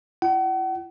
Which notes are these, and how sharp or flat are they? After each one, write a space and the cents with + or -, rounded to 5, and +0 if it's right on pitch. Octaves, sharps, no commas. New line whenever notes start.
E4 +40 F#5 +40